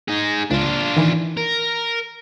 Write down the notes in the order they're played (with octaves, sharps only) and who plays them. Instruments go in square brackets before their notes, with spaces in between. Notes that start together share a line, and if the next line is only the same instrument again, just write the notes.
[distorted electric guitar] D#4 G#4
[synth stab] C#2 [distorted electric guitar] D4 F4
[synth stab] D#3 E3
[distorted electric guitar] A#4